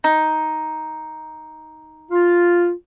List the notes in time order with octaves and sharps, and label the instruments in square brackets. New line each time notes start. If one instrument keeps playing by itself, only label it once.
[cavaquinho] D#4
[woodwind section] F4